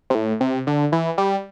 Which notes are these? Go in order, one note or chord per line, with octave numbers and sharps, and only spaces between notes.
C3
A2
C3
D3
E3
G3